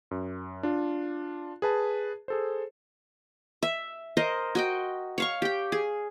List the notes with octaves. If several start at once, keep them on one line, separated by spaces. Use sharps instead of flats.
F#2
D4 F4
G#4 B4 A5
G#4 A4 C5
E5
A#4 C5 D#5
F#4 D#5 G5
C#5 F5 C#6
G4 G5
G#4